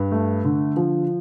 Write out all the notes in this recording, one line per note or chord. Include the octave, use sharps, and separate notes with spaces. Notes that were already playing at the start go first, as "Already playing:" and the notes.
Already playing: G2
A3
D3
F3